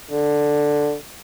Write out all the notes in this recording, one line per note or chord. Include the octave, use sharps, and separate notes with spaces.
D3